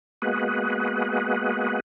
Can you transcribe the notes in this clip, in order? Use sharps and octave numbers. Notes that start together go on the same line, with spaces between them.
G#3 A#3 B3 F#4 G#4 B4